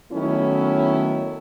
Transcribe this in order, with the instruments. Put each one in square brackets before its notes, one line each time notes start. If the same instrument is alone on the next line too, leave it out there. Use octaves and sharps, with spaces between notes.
[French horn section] D#3 F#3 A3 B3 C#4 E4